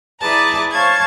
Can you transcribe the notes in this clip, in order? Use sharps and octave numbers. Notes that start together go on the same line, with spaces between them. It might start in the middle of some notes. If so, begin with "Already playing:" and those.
E4 G#4 B4 D5 A5 A#5
C5 C#5 F5 A5 C#6 G#6